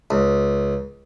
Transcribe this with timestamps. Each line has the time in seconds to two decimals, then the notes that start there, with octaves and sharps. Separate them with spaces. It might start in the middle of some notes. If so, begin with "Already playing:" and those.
0.11 C#2